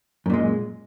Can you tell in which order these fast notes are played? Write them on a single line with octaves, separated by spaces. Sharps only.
F#2 A#2 G#3